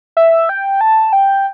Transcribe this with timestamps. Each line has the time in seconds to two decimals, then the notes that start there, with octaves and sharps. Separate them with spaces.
0.17 E5
0.49 G5
0.81 A5
1.13 G5